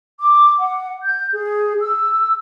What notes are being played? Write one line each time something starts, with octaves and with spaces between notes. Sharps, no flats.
D6
F#5
G6
G#4
E6